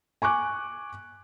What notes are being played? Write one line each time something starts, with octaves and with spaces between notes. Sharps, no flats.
G#5 C#6 D6 F#6